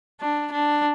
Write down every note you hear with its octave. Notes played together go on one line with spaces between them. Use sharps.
D4
D4